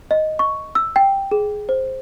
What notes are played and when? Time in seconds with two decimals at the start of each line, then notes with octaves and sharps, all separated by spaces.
0.11 D#5
0.39 C#6
0.75 E6
0.96 G5
1.32 G#4
1.69 C5